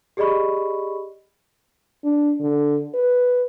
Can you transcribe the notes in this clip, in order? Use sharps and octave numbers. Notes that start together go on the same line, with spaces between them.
G4 G#4 D5 D#5 B5 C#6
D4
D3
B4